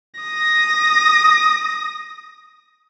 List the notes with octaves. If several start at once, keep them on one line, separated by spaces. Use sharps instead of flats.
D#6 A#6